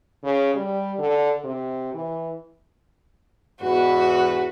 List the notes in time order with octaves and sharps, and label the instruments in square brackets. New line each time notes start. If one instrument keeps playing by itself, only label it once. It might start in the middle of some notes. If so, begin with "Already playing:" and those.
[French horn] C#3
G3
D3
C3
E3
[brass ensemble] E2 G#2 B4 [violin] F#4